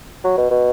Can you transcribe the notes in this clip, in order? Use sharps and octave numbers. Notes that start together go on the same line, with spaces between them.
F#3
B2
B2